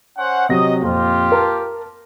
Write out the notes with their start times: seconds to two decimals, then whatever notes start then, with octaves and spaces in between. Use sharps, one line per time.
0.18 C#4 C5 F#5
0.49 C3 F#3 D#5 A#6
0.82 F2 A#2 F4 G4
1.32 A#4 A5